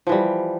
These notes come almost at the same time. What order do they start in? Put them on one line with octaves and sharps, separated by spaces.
F3 E3 G3